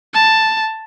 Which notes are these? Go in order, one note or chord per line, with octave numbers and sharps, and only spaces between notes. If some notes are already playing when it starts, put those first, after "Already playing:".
A5